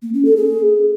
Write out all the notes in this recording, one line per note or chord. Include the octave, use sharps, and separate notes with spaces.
A#3
C#4
A4
G#4